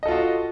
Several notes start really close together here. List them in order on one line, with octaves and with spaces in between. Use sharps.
D#5 A4 F4 F#4